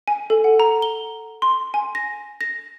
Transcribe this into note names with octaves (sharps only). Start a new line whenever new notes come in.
G#5
A4
F#5
A#5
G7
C6
G#5
A#6
A#6